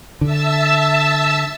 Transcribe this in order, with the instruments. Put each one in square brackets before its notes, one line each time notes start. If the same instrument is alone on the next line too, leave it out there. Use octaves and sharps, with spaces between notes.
[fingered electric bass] D3 [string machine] E5 A5 E6